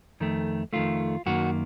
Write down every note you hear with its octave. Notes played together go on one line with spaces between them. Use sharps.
F2 D#3 A3
F2 D#3 A3 F4
F#2 D#3 A#3 F#4